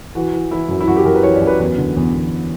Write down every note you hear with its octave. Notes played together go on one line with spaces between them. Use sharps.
E3 F#4
E3
E3 E4
F#2
E4
F#2 F#4
G4
F#2 A#4
B4
E3 C#5
D5
F#2
B4
E2 B4
D3
E2
E2